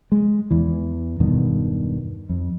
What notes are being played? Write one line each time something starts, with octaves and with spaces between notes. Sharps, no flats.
G#3
E2 E3
E1 G2 B2 D#3
F2